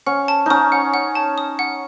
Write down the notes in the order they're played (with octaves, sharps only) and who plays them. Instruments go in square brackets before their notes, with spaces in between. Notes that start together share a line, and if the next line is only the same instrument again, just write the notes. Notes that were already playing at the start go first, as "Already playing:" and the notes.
[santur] C#4 [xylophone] F#5
[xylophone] A5
[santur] C#4 D#4 [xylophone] D#6
[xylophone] F#5
F#5
A5
D#6
F#5